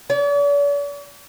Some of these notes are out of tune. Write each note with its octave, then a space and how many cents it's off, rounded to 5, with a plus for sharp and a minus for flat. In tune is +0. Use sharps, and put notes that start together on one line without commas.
D5 -45